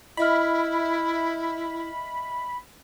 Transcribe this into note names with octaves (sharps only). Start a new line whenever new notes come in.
E4 D#5 E5 B5 F6